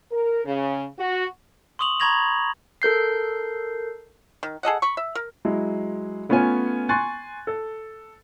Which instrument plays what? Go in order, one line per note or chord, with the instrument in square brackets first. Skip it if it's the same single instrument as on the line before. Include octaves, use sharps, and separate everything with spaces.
[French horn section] A#4
C#3
F#4
[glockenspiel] C6 C#6 D#6 F7 F#7
A#5 B5 C#6 G#6 A#6 F7
[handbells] A4 A#4 G6 C7
[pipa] D#3
G#4 A4 D#5 F#5
B5 C#6
E5
A#4
[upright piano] F#3 G#3 E4
A3 B3 C#4 F4 C#5 G#5
G#5 C6 C#6 F#6 A6
A4